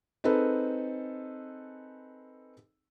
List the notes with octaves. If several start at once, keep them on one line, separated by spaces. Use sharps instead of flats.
C4 D#4 G#4 A4 B4